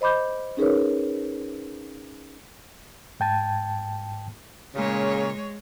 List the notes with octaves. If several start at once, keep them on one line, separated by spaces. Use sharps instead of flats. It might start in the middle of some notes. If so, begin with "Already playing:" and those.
C5 D#5 B5 D6 G6
C#4 D#4 G#4 A#4 B4 C#5
G#2 G5 A5
A#2 C#3 G#3 C#5